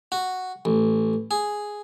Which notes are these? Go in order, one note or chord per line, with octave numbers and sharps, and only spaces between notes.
F#4
A1
G#4